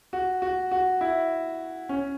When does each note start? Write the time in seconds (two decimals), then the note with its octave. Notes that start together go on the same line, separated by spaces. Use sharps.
0.13 F#4
0.42 F#4
0.71 F#4
1.01 E4
1.89 C#4